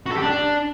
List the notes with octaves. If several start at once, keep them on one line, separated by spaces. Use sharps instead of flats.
F#4
A4
G4
D4